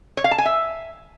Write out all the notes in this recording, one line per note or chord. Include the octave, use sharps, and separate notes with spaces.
C#5
F5
A5
G#5
E5